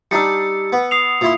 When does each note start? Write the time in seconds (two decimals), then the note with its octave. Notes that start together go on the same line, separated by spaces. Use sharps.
0.11 G3 D4 D#4 E6 C#7
0.72 B3
0.91 D#6 C7 F7
1.21 A#2 E4 C6